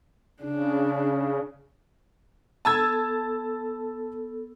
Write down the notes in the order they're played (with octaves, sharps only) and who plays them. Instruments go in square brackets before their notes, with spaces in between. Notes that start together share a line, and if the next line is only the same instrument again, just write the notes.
[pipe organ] C#3 [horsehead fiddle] D4
[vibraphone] B3 A4 [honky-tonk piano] A5 E6 G#6